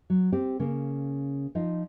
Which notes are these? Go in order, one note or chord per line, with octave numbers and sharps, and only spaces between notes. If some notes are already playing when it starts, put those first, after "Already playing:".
F#3
C4 G4
C#3 A#3
F3 D#4 F4